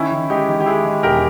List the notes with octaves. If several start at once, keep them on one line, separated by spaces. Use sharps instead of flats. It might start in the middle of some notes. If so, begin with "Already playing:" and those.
Already playing: D#3 C#4 E4
D#3
G#3 D#4 G4
D#3
G4
G#3 E4 G#4
G#3
E1 G4 A#4